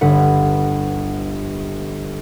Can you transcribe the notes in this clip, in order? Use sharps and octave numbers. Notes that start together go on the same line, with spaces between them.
G1 B4 F#5